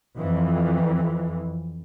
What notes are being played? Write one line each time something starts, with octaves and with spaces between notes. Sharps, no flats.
F2 E3